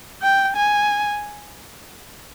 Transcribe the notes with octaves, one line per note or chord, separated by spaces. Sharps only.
G5
G#5